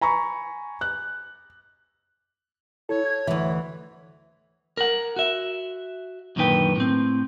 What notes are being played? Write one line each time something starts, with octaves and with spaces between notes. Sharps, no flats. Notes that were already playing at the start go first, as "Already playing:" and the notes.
G#5 A#5 B5 C#6
F#6
E4 A4 C#5
G#6
D2 E3 E5
A#4 F#5
F#4 E5
F#2 A#2 D3 D#3 B4 G5
A2 C4